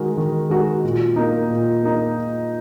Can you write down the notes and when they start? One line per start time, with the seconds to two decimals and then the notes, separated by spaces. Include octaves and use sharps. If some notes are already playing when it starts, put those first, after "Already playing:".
Already playing: D#3 G#3 D#4 F#4 A#4
0.17 D#3
0.50 G#3 D#4 F#4 A#4
0.84 A#2
1.16 A#3 D#4
1.50 A#2
1.83 A#3 D#4